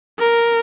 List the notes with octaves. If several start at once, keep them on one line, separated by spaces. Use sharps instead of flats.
A#4